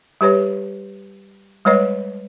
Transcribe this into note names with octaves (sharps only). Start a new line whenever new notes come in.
G3 G4 B4 C#5
G3 G#3 B4 C#5 D#5